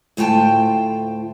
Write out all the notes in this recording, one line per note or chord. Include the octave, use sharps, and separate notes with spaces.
D2 A2 F4 G5 A5